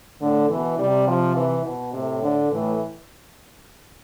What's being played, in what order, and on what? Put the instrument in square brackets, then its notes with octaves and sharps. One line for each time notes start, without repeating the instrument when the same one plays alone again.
[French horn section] A2 [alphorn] D3
[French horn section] B2 [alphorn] E3
[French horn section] C3 [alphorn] G3
[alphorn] F3
E3
B2
[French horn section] A2 [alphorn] C3
[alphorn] D3
[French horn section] A2 [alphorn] E3